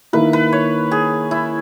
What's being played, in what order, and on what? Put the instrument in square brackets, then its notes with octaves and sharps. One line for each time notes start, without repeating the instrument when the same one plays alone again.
[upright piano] D#3 A#3 E4 [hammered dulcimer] B4
[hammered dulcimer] B4
C#5
G#4
E4